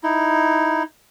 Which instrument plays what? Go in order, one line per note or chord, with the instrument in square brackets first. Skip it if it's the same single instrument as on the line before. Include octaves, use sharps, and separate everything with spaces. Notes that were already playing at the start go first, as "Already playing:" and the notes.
[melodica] D#4 E4